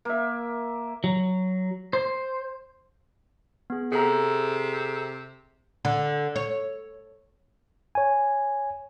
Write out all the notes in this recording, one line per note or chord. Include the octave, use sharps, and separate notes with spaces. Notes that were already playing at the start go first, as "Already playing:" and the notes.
A#3 E5
F#3
C5
B3 G#4
C3 G#4 A4 A#5
D3
C#5
C#5 G#5